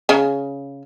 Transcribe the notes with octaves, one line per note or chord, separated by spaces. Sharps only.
C#3